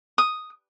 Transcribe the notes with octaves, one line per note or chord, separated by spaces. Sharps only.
D#6